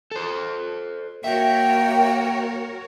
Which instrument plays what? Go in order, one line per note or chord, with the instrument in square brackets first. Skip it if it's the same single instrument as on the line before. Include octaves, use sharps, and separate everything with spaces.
[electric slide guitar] A4 C5
[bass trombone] A#3 [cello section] F#4 A#4 C#5 [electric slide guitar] E5 [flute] G5